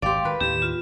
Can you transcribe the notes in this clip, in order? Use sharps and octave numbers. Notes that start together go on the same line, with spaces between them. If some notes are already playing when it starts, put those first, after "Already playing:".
G#1 G4 D5 F5 G5 C6
D#3 B4
D#2 A2 G4 E7
F4